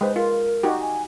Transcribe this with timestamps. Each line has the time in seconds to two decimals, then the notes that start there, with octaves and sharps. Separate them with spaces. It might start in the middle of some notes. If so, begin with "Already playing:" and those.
0.01 G#3 B4 C5
0.16 F4 A#4
0.63 D#4 F#4 G4
0.81 G#5